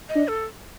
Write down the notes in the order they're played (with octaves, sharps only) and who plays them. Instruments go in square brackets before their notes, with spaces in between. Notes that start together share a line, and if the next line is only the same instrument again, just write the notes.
[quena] D#5
[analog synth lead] D4
[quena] A4